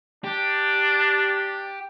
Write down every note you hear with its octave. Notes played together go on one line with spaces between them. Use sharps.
D4 G4